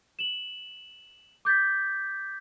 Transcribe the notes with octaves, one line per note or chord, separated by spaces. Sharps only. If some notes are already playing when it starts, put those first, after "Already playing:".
E7 F#7
D6 G6 A6 B6